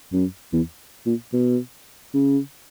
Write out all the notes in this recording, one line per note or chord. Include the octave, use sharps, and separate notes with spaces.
F#2
E2
A#2
B2
C#3